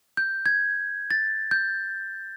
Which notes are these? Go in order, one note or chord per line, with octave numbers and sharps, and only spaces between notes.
G6
G#6
A6
G6